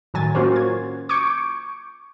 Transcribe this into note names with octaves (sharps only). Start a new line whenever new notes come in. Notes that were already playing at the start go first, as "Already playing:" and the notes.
A2 D#3 F#3 G#5 A6
A#3 C#4 F4 F#4 A#4 C5
G#6
C#6 D6 G6 G#6 C#7 D7